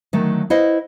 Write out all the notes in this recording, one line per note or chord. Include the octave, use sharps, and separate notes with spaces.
D3 D#3 F#3 A3
E4 B4 C5 D#5 F5 F#5